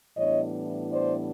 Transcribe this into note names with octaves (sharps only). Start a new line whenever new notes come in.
A2 E3 G3 B3 D4 C#5 D#5
C5 D5